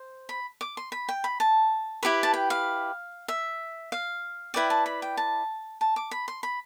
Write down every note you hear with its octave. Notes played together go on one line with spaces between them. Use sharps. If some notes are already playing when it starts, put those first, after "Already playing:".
Already playing: C5
B5
D6
C6
B5
G5
B5
A5
E4 G4 B4 B5
A5
G5
F5
E5
F5
E4 B4 D5 G5
A5
B5
G5
A5
A5
D6
B5
C6
B5